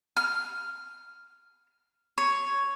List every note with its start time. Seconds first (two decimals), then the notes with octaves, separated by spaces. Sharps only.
0.17 F6
2.18 C#5